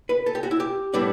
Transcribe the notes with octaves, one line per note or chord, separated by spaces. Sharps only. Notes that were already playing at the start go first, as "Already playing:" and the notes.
B4
A4
G4
F#4
E4
G4
A2 G3 B3 D4